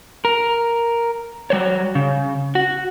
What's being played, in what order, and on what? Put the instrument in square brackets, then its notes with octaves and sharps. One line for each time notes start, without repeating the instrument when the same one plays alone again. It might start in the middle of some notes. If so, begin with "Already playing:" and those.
[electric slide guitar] A#4
F#3 G3 C5 C#5
C#3
F#4